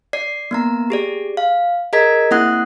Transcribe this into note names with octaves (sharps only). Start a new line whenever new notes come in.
D5 C7
A#3 B3 A#5
G4 G#4 D5
F5
G#4 A#4 D#5 A#5 G#6 B6
A#3 C4 E4 F#5 D#6 F#6